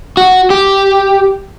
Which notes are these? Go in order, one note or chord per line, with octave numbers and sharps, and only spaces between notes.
F#4
G4